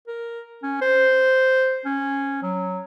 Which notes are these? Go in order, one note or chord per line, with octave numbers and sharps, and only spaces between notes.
A#4
C#4
C5
C#4
F#3